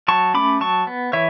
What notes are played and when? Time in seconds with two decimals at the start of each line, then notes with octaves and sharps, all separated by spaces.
0.08 F#3 A5 C#6
0.34 A3 C#4 B5 D6
0.61 F#3 A5 C#6
0.87 B3
1.13 E3 C#5 E5